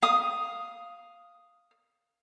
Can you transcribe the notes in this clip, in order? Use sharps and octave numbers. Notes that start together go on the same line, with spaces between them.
F5 D#6